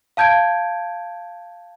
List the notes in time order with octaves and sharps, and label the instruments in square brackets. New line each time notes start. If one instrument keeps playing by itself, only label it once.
[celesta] F5 A5 G6 G#6 D7